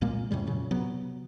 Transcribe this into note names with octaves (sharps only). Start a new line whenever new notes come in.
C2 A#2 G#3 A#3
F2 A2 C#3 G3
A#2 C#3 F#3
C3 F#3 B3